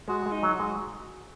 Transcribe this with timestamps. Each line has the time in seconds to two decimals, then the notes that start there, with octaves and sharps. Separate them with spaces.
0.08 G#3 F#4
0.26 G#3
0.32 D#4
0.43 F#3
0.54 F#4
0.60 G#3